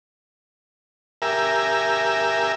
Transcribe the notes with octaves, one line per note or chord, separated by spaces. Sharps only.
G4 A#4 E5 G#5